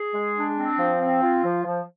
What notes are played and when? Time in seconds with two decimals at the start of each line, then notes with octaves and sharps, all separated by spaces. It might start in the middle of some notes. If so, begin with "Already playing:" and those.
Already playing: G#4
0.15 G#3
0.37 D4
0.57 C4
0.79 F3
1.00 C4
1.22 F4
1.43 F3
1.64 F3